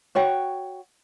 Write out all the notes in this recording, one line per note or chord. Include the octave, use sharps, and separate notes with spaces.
F#4 C#5 F#5 G5